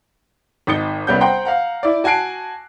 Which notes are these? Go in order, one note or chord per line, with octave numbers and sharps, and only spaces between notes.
G#1 D#4 D#6 A6 C#7 G7
C2 G3 B3 C#4 G6
C5 F#5 G5 A#5 C6
F5 F#5 A#5
E4 D5
F#4 G#5 A5 F#6 C7 D7